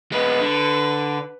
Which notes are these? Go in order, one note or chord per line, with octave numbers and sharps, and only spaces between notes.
G#3 B3 B4
D3